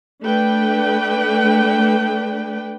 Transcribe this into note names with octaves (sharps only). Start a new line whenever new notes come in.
A3 D4 B4 G5